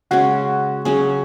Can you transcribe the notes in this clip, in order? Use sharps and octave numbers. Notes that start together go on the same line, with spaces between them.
C#3 G#3 C#4 F#4
C#3 F#3 C#4 G#4